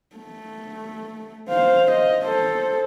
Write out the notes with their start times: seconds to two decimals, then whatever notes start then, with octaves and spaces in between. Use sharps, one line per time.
0.16 A3
1.49 C5 F5
1.92 D#5
2.25 A4 C5